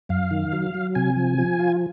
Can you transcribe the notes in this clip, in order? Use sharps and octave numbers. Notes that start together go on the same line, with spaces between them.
F#2 F5
D#3
F#3
F#3
C3 G#5
F3
F3
F4